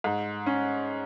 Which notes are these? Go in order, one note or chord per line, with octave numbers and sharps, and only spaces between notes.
G#2
C#4